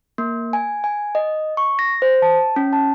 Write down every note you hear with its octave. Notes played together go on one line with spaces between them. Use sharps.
A#3
G#5
G#5
D#5
C#6
A#6
C5
A5
C#4
A5